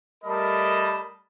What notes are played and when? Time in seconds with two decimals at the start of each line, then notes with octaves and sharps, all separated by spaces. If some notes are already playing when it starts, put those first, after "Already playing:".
0.24 G3 A3 A#4 D#5 A5 B5